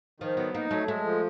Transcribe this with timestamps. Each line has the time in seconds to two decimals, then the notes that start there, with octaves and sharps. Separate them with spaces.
0.20 D#3 F3
0.37 F#3 B3
0.54 A#3 D#4
0.71 F#3 A3
0.88 G#3 A3
1.05 F3